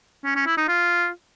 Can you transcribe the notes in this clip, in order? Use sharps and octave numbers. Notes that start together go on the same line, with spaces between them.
C#4
C#4
E4
D#4
F4